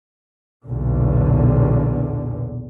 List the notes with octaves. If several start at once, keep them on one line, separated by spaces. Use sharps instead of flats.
B1 E2 A#2 D3